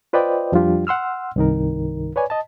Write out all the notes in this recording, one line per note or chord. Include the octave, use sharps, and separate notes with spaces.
F4 B4 C5 D5 D#5 G5
F2 F3 G3 D4 F4 G4
F#5 C6 E6 F6
C2 G2 D#3 D#4 A#4
B4 C#5 D5 G#5
D#5 A5